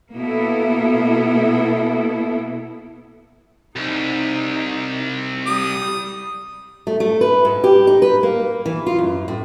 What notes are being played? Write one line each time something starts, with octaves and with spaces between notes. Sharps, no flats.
B2 A#3 B3 E4 A4
C2 D#4
G3 D#6
A3
A3
B4
G#2
G4
D#4
B4
A#3
E3
F4
F#2
A2